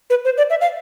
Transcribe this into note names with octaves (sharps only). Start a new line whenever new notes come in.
B4
C5
D5
E5
F5